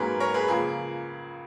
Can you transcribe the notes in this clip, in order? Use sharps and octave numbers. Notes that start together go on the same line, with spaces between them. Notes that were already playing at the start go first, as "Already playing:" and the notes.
Already playing: G#2 F#3 A#3 C#4 G#4 B4
A#4 C#5
G#4 B4
C#2 C#3 F3 A#3 G#4